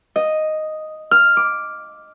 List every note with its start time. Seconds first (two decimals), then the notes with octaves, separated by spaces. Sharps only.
0.16 D#5
1.11 F6
1.37 D6